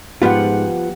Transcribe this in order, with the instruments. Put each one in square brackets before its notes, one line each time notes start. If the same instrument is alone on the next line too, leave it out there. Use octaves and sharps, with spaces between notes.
[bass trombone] G#2 [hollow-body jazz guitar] F3 B3 F4 [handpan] G4 F#5